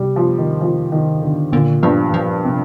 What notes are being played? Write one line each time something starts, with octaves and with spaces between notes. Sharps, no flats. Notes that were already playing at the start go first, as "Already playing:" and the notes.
Already playing: C3 G3
F3
D#3
F3
D#3
D3
A#2 D3
G2 F3
F3
C3